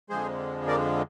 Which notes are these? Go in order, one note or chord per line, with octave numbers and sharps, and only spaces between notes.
F2 D3 F3 G#3 G#4 C5
A#4 D5